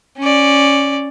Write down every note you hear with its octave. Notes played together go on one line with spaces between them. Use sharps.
C#4 D5